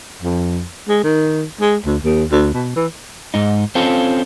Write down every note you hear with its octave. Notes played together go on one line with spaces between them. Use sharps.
F2
G#3
D#3
G#3
D2
D#2
D2
B2
E3
G#2 D#4
C4 C#4 F4 A4